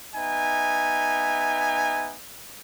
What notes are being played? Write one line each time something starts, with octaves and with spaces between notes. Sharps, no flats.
B3 D#4 E5 G#5